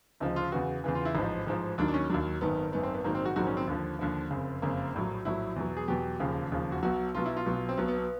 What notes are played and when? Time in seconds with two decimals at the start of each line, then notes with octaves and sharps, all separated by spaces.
0.20 D2 C#3 F3 D#4
0.36 F4
0.52 E2 C#3 E3 F#4
0.84 E2 C#3 E3
0.95 F4
1.05 E4
1.15 A1 G#2 F3 D#4
1.47 A1 G#2 F3
1.78 D#2 D#3 F#3 D4
1.88 D4
1.94 C#4
2.10 F#3 D4
2.12 D#2 D#3
2.41 G#1 F#2 D#3 B3
2.72 G#1 F#2 D#3 B3
2.83 C4
2.94 B3
3.04 A#1 G#2 D#3 F#3 A#3
3.15 C4
3.26 F#4
3.36 A#1 G#2 D#3 F#3 F#4
3.47 C#4
3.57 C4
3.67 D#2 D3 F3
3.99 D#2 D3 F3
4.31 F#1 F2 C#3
4.62 F#1 F2 C#3 A#3
4.94 A#1 A2 F#3
5.25 A#1 A2 F#3 E4
5.56 E2 B2 F#3
5.77 G#4
5.88 E2 B2 F#3 G4
6.20 E1 D#2 C#3 F3
6.52 E1 D#2 C#3 F3
6.72 F#4
6.83 B1 B2 F#3 F#4
7.15 B1 B2 F#3 F4
7.26 E4
7.37 F4
7.46 B1 B2 F#3
7.69 C4
7.77 B1 B2 F#3 B3
7.88 B3
7.98 B3